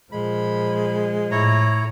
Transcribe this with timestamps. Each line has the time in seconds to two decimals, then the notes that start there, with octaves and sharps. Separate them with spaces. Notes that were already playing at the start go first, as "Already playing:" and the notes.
0.12 A#2 F3 G#3 B5
1.31 A2 E4 C#5 A#5